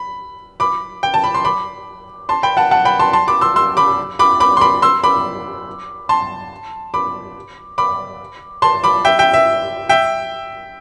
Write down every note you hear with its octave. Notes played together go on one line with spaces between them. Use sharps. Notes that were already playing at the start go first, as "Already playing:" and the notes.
Already playing: B5
B5 D6
G5
A5
B5
C6
B5 D6
A5 C6
G5 B5
F#5 A5
F#5 A5
G5 B5
A5 C6
A5 C6
B5 D6
C6 E6
C6 E6
B5 D6
B5 D6
B5 D6
C6
B5 D6
C6 E6
B5 D6
A5 C6
B5 D6
B5 D6
A5 C6
B5 D6
E5 G5
E5 G5
E5
E5 G5